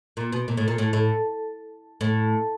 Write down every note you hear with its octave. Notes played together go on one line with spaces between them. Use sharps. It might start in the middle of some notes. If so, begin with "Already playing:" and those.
A#2
B2
A#2
A2
A#2
A2
A2
A2